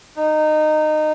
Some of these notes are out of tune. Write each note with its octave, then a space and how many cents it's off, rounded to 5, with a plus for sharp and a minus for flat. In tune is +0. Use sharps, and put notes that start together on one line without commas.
D#4 -20